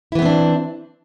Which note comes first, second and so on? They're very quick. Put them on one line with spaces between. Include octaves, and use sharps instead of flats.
E4 E3 B3 C4 D4